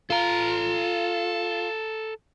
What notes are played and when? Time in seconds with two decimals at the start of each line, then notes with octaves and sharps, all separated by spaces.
0.10 F4 A4 A#5